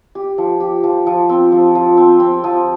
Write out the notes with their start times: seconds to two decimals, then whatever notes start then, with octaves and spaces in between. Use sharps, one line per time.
0.15 G4
0.38 F3
0.60 G4
0.83 F3
1.06 F3
1.29 C4
1.52 F3
1.75 F3
1.97 C4
2.20 C4
2.44 F3